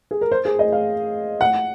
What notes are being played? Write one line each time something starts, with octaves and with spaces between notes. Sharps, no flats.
G#4
A#4
C5
G#4
D#5
F5
F#5